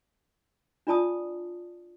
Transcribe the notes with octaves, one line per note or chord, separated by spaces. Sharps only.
D4 F4 D5 A5 D#6